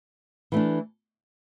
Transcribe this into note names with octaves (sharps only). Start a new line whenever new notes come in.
E3 A3 D4